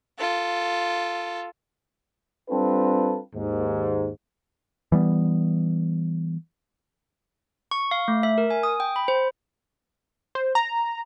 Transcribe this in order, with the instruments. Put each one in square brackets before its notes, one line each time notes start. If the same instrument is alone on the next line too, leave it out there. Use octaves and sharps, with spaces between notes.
[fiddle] F4 A4
[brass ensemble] G3 C4 D4 F4 A4 B4
D#2 G#2
[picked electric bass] E3 G3 B3
[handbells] C#6
F5
A3
E5
A#4
G#5
D#6
G5
B5
C5
[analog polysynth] C5
A#5